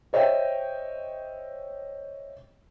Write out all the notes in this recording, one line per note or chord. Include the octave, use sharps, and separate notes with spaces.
C5 C#5 D#5 E5 G5